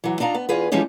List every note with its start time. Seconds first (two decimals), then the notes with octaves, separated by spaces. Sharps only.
0.04 E3 F#3
0.20 D4 D#4 F4 A#5
0.34 B3
0.49 E2 F4 G#4 B4
0.72 E3 F3 G3 G#3 C#4 D#4